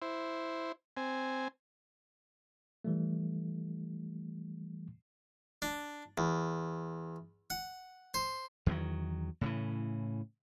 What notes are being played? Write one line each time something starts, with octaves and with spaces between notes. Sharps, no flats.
E4 C5
C4 G#5
E3 G3 A3
D4
E2
F#5
C5
E2 D#3 F3 F#3
A2 C#3 E3